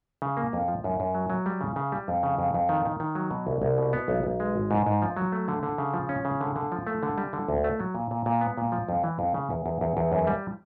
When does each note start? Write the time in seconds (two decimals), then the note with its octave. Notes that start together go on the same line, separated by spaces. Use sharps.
0.22 C#3
0.37 A#3
0.53 F2
0.68 F3
0.84 F#2
1.00 F#2
1.15 F#3
1.30 F#3
1.46 G3
1.61 C#3
1.76 C#3
1.92 G3
2.08 F2
2.23 C#3
2.38 F2
2.54 F2
2.69 D#3
2.85 D#3
3.00 D#3
3.15 F#3
3.31 B2
3.47 C2
3.62 C2
3.78 B2
3.93 B3
4.08 B1
4.23 B1
4.40 G#3
4.56 G#1
4.71 G#2
4.86 G#2
5.02 F3
5.17 F#3
5.32 A3
5.48 D3
5.63 D3
5.78 C#3
5.94 F3
6.09 C#4
6.25 C#3
6.41 D3
6.56 D3
6.72 F3
6.87 A3
7.03 D3
7.18 G3
7.33 D3
7.48 D2
7.64 A3
7.80 F#3
7.95 A#2
8.11 A#2
8.26 A#2
8.41 B3
8.58 A#2
8.72 F3
8.89 F2
9.04 E3
9.19 F2
9.34 C#3
9.50 E2
9.66 E2
9.81 E2
9.97 E2
10.12 F#2
10.27 G3